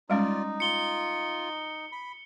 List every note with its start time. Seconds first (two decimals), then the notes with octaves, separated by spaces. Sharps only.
0.10 G3 G#3 C#4 D#4 F4 D5
0.60 F4 C#7 G7
1.92 B5